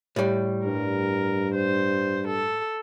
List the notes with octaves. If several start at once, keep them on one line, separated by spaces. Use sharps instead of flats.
A2 G3
G2 A#4
C5
A4